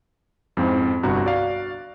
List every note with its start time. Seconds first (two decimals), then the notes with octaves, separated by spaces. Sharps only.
0.57 F2 G#2 F3 C4 C#4 E4
1.03 G1 C2 G2 F#4 A#5 F#6
1.25 F#4 D5 F5